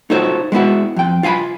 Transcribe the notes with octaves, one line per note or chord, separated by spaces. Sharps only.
D#4 F4 F#4 A4 C5 C#5
G#3 B3 E4 F#4
F2 G5
F4 F5 G#5 B5